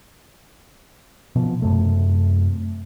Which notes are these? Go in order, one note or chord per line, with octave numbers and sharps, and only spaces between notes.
B2 F3
F#2 C3 A3